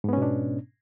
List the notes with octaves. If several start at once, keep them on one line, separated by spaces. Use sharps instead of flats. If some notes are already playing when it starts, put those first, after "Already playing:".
G#2 B2 B3 C#4 D4